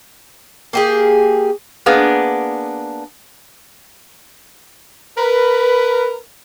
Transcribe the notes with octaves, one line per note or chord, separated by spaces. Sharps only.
A#3 G4 G#4
A#3 B3 D4 G#4
A#4 B4